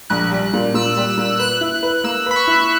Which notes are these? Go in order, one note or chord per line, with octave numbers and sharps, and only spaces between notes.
A#1 F#6
G3
A#2
A#2 E6
G3
A#2
B4 F#6
E4
B4
A#3 E6
B4 B5
C#6
E4